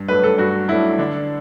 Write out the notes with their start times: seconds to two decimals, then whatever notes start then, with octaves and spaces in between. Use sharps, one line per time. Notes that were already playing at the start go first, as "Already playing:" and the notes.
Already playing: G2
0.08 F#3 A3 D4 B4
0.24 A4
0.38 G2 F#4
0.68 F#3 A3 D4 E4
0.98 D3 D4